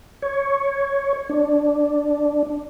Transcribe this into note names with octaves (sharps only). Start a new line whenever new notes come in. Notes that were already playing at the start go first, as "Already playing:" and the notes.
C#5
D4